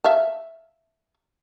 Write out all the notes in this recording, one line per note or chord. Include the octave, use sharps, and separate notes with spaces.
E5 F5 A5